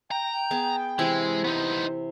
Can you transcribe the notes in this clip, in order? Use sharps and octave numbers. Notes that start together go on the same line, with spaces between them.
G5 A#5
B3 G#4 A5
C3 E3 G#3 E4
B3 D#4 C5